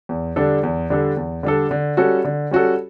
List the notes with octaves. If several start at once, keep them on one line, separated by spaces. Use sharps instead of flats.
E2
D3 G3 D4 A4
E2
D3 G3 D4 A4
E2
D3 G3 D4 A4
D3
G3 C#4 F#4 A4
D3
G3 C#4 F#4 A4